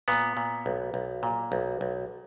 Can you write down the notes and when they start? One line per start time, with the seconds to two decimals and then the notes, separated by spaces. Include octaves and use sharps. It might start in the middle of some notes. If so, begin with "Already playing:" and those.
0.08 A#2 B3
0.37 A#2
0.66 B1
0.94 B1
1.23 A#2
1.52 B1
1.81 B1